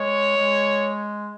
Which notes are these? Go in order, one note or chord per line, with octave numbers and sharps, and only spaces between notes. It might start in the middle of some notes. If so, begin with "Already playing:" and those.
Already playing: G#3 C#5
G#3